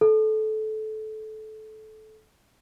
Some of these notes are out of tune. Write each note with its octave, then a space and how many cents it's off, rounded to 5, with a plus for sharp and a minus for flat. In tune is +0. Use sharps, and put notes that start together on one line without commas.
A4 -20